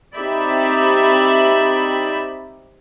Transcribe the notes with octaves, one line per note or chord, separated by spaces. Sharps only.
C4 D#4 G4 D5 E5 B5